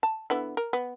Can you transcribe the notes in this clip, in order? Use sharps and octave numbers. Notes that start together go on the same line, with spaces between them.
A5
D3 B3 E4
A#4
B3